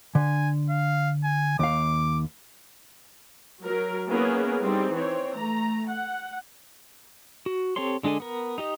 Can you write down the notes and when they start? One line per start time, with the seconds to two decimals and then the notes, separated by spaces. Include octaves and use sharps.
0.15 D3 G#5
0.70 F5
1.24 G#5
1.59 D#2 F5 D6
3.63 F#3 A#4
4.08 A#3 B3 C#4 E4 G#4 A#4
4.61 G3 C4 D#4 G#4
4.94 E3 C4 C#5
5.35 A3 A#5
5.87 F#5
7.46 F#4
7.76 C4 G4 A4 C#5 C6
8.03 D3 G#3 D4 A4 G#5
8.20 B3 A#4
8.58 D#4 G4 D#5